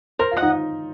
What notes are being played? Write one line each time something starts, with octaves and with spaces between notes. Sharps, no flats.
A#4 C5
F4
D#5 F#5
D#4